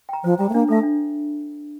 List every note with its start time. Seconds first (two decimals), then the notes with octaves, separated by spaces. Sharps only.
0.09 G5 A#5
0.24 F3 C5
0.39 G3 G5 A#5
0.49 A3
0.53 A#3 D4
0.69 A3 A4 E5
0.83 D4